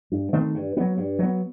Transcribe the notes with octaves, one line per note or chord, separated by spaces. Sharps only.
G2
D#3 A3 C4
G2
F#3 B3
G2
F#3 B3